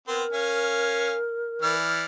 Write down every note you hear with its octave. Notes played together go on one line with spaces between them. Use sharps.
B3 C4 A#4 C6
C#4 F5 G#5
E3 D5 F6